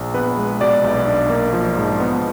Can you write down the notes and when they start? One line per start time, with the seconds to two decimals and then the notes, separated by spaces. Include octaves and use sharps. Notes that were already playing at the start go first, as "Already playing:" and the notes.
Already playing: A#1
0.14 B3 B4
0.37 G#3
0.60 B2 D5
0.84 B1
1.07 D4
1.30 A#3
1.53 F3
1.77 G#2
2.00 B3